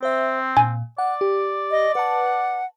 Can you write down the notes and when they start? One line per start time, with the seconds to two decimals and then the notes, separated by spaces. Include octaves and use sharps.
0.03 C4 C5 E5
0.57 A#2 G#5
0.98 D5 F#5
1.21 G4
1.71 D#5
1.95 B4 F#5 A5